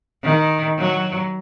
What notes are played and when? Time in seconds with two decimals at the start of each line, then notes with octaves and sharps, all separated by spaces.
0.24 D#3
0.78 F#3